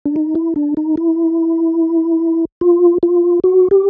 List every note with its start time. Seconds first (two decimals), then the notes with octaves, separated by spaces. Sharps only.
0.06 D4
0.16 D#4
0.35 E4
0.56 D4
0.77 D#4
0.97 E4
2.61 F4
3.03 F4
3.44 F#4
3.71 G4